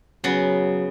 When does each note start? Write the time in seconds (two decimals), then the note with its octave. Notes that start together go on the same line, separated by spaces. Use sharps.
0.24 C#3 F#3 B3